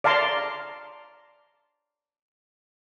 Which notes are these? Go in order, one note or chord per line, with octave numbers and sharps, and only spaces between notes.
D5 F5 A5 A#5 C6